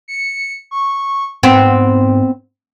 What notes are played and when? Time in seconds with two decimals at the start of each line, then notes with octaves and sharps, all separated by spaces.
0.08 C#7
0.71 C#6
1.43 G#2 B3 C4